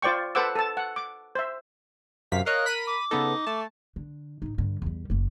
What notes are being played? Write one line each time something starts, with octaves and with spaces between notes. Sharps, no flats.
F4 C5 D5 G5 C#6
A4 B4 C5 F#5 D6 E6
A4 A5
F#5
D6
C5 E5
F#2 C3 F5 B6
A#4 C#5 D#5 F5 F#6
B5 B6 D#7
D6
C#3 B3 D#4 A4
A3 A5
D3
A2 D#4
G2 D3
E2 G3
F#1 A#3